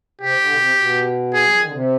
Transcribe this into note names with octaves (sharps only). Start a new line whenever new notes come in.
C3 G4
D3
B2
C3
B2
G#4
G3
F3
D#3
D3
C3